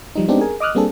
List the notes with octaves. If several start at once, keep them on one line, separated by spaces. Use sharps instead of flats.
F3 G3 D#4
G#3 B3 C4 D4 D#4 G4
G#4 A#4 G#5
D#5 D6 D#6 F6 F#6
G3 A#3 C4 D4 G#4 A4